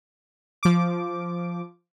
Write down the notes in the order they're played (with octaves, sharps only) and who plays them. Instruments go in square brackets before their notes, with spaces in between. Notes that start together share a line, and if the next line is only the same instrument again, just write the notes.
[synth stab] F3 D6